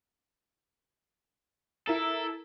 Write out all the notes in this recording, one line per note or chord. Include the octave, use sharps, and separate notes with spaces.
E4 A4 A#4